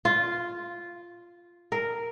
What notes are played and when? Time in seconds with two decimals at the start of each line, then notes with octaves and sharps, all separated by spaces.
0.05 F4
1.72 A#4